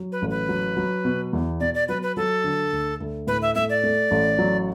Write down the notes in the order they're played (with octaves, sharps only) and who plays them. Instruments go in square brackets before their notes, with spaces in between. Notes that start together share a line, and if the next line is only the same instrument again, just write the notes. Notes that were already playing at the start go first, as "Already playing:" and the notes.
Already playing: [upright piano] F#3
[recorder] B4
[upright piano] A1
[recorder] B4
[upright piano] F#3
F#3
B2
E2
[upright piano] B2 [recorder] D5
[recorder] D5
[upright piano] F#3 [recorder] B4
[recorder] B4
[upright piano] F#3 [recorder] A4
[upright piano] D3
D2
D2
[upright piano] A2 [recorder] B4
[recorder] E5
[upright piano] A3 [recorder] E5
[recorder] D5
[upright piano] A3
A1
F#3